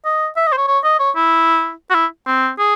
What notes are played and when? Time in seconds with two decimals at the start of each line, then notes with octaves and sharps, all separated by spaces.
0.05 D#5
0.37 E5
0.47 D#5
0.52 C5
0.57 C#5
0.68 C#5
0.84 D#5
1.00 C#5
1.16 E4
1.90 F#4
1.95 E4
2.27 C4
2.59 G#4